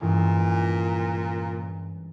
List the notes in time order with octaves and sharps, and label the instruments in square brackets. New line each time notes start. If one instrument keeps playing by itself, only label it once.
[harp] G2 E3 G#3 C#4 E4 [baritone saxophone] A#2